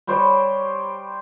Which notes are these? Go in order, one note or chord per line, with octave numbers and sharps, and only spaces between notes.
G3 G4 C5 C#5